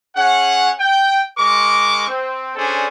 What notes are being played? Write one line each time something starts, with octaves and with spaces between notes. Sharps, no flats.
C#4 G#4 C#5 F#5
G5
G#3 A#4 C#6 D6
C4
C#4 D4 G#4 A4 C5 D5